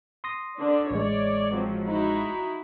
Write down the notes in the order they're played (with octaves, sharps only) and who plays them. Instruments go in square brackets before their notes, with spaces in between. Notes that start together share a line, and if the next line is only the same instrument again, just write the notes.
[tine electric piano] C6 D#6 A#6
[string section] D3 D4
[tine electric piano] A1 G#3 [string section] C#5 D5
[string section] F3 F#3 C4
D#4 E4 F#4